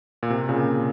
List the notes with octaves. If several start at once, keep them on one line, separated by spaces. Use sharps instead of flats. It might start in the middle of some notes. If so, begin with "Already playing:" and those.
A#2
C3
A#2 C#3